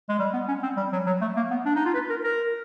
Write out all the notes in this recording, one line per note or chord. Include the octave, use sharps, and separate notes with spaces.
G#3
G3
B3
C#4
C4
G3
F#3
F#3
A3
A#3
B3
D4
D#4
F4
B4
A#4
A#4